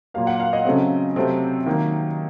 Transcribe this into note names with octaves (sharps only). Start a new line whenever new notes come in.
A#2 F#3 A#3 F5
F#5
F5
D#5
C#3 F#3 A3 C4
C3 F#3 A3 C4
D#3 F#3 A#3